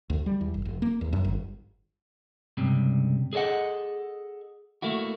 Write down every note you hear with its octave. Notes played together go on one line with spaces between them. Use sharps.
D2
G3
E2
G1
F1
A#3
E2
F#2
G1
C#2 G2 C3
G#4 A4 C#5 D#5 F#5
A3 A#3 E4 F#4